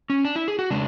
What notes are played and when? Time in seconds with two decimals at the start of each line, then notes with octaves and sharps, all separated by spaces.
0.10 C#4
0.25 D4
0.36 E4
0.48 G#4
0.59 F#4
0.70 C#3 G#3 D4